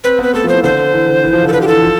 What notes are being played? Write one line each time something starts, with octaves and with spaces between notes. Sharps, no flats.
C4 B4
B3 B4
A3 A4
F3
C5
E3
D3 C5
E3
D3
E3
F3
D3
A4
D3 B4
G4
E3 A4
F3